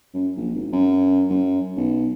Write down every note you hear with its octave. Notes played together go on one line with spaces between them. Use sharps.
F#2
A#1
G#1
F#2
F#2
B1